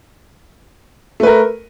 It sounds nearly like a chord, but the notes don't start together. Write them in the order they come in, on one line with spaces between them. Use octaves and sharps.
A3 B4 A#4